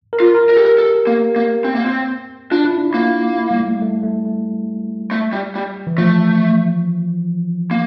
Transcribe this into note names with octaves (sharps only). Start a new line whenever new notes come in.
A#4
F4
A#4
A#4
G4 A4
A#4
A4
A#3
A#3
C4
A#3
C4
D4 F4
E4
D4
A#3 E4
E4
G3
A3
A3
A3
A3
A3
G3
G3
E3
F3 A3
A#3